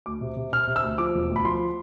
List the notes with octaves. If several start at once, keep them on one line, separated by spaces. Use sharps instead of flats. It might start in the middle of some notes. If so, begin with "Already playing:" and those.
D2 D6
C3
C3
C3 F6
C3
E6
D2
F3 D6
E1
D2
B5
F3 C6